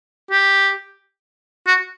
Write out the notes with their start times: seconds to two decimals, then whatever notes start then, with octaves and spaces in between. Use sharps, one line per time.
0.31 G4
1.67 F#4